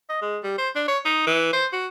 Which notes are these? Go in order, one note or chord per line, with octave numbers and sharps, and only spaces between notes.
D#5
G#3
G3
C5
D4
C#5
D#4
E3
C5
F#4